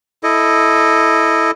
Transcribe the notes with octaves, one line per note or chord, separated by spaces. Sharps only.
E4 A4 D#5